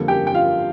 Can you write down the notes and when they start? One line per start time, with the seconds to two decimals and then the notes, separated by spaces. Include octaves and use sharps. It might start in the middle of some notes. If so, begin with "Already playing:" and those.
Already playing: F2 D3 G3 A#3 A4
0.08 G4 G5
0.27 G5
0.34 F4 F5